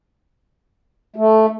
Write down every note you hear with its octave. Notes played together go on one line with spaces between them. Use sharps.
A3